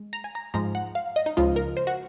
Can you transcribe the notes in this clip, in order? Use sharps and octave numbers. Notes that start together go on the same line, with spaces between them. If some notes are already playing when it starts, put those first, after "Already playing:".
Already playing: G#3
A#5
G#5
A#5
G#2 F3 G#3 A#5
F#5
F5
D#5
D#4
C#2 C#3 F3 G#3 F4
A#4
C5
F#4